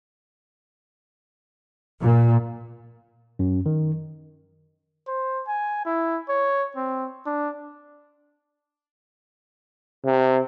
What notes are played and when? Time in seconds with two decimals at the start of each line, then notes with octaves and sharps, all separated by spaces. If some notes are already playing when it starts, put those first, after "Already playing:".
2.02 A#2
3.39 F#2
3.66 D#3
5.08 C5
5.47 G#5
5.86 E4
6.29 C#5
6.76 C4
7.26 D4
10.05 C3